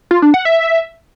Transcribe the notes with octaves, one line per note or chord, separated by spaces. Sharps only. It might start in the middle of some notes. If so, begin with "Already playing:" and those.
F4
D4
F#5
E5